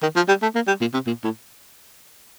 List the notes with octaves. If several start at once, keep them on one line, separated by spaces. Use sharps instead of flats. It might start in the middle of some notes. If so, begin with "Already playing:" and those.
D#3
F3
G3
A3
A#3
G3
A#2
C3
A#2
A2